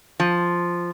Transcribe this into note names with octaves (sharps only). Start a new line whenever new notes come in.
F3